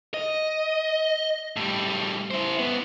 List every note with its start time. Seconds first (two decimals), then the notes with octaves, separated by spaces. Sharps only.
0.14 D#5
1.57 A2 G3
2.31 E4 C5
2.59 G#2 B3